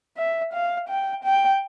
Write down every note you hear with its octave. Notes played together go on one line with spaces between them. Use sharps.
E5
F5
G5
G5